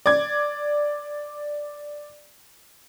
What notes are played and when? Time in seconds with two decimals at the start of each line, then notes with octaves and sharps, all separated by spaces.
0.06 D5 G#6